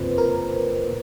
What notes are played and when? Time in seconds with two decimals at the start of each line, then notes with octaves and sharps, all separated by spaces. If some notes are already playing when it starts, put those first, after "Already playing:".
Already playing: F#1 F2 C3 F3 B4 C5
0.18 A#4
0.87 A#2